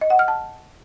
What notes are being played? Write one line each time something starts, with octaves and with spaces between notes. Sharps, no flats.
D#5
F#5
F6
A5